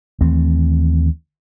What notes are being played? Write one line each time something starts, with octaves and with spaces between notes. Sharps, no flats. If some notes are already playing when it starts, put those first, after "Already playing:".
D#2 E3 A3 C4